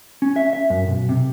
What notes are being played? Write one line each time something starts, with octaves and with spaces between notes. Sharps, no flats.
C#4
E5
E5
F#2
B1
C3